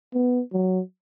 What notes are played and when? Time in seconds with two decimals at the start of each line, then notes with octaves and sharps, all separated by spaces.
0.14 B3
0.53 F#3